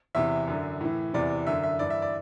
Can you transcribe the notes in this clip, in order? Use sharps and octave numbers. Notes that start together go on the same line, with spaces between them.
E2 C3 E3 E5
F#2 D3
A2 E3
E2 C3 E3 D5
F#2 D3 E5
E5
G2 E3 D5
E5
D5